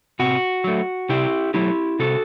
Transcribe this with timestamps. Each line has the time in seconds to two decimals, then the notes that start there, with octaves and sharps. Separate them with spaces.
0.19 C3 F#4
0.64 F#3 A3
1.09 C3 E4 G4
1.54 F#3 A3 E4 G4
1.99 C3 F#4 A4